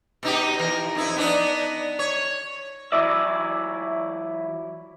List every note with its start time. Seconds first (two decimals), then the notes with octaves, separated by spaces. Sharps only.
0.23 B2 D#4 G4
0.59 E3 A#4
0.95 F2 D#4 E4
1.17 B3 D4 D#4
1.99 C#5
2.92 E3 F#3 E4 D5 E5